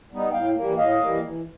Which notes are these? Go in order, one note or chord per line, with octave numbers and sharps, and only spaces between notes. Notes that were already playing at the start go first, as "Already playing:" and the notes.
G3 B3 D#4
A2 F5 G5
E3 G3 A#3
A2 D#5 F5
E3 G3 A#3
E3